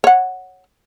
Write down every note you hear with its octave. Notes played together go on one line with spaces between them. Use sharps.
C#5 F#5